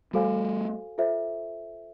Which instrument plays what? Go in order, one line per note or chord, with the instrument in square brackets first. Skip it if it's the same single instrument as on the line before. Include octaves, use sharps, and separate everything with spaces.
[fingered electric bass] G3 A3 [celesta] F#4 A4 C5 F5 G#5
[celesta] F4 A4 C5 E5